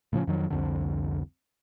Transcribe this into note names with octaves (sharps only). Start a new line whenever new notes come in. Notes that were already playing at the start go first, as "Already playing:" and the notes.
A2 C#3 F3 C#4
F2 D#3 F#3
C2 F2 D3